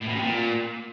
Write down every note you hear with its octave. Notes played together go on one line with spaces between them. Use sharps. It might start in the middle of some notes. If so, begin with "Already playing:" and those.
A2
B2
C3
A#2